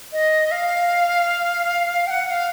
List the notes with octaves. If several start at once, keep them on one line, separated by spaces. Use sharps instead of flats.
D#5
F5
G5
F#5
F#5
F5